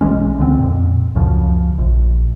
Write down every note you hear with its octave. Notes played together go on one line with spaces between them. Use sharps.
B1 E3 G#3 C#4
C#2 D3 G#3 C4
F2 A#2
C#2 F#2 C#3 F3
A#1